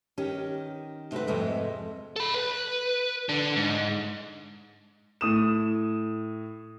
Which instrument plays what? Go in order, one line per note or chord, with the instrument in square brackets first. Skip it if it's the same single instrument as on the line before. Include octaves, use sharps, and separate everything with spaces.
[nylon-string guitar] D#3 C#4 G4
C3 A3 F#4 B4
F2 G#2 C3 G#3 A3
[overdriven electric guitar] A4 B5
B4
D3
G#2
[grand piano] A2 D#6 E7